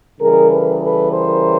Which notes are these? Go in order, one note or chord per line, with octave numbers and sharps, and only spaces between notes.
C#3 E3 G3 G#4 A#4
A4 B4
A4 B4
A#4 C5